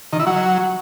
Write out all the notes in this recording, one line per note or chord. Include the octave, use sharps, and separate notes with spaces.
D#3
E4
F#3